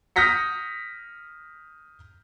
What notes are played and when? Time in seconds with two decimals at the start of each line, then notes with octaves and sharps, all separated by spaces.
0.16 D#6 F6 G6 A#6 B6 C#7